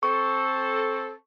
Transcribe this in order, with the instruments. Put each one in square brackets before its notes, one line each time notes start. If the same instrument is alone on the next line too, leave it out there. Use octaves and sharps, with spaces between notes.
[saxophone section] C4 A4 [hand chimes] C#6